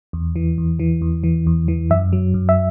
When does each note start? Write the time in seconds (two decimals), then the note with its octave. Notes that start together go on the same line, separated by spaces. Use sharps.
0.13 E2
0.36 E3
0.58 E2
0.79 E3
1.02 E2
1.24 E3
1.47 E2
1.68 E3
1.90 F#2 E5
2.13 F#3
2.34 F#2
2.49 E5